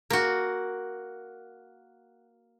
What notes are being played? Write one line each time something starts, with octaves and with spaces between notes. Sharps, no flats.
A#3 F#4